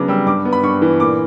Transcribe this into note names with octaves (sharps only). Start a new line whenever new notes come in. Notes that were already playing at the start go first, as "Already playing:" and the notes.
Already playing: C#3 F#3 B3 D4 D6
G3 E6
G2 D6
B3
B5
G2 C#6
E3
A#2 D6